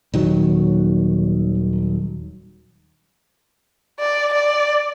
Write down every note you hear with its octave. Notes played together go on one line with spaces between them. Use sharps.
D#1 D#3 F#3
D5
D5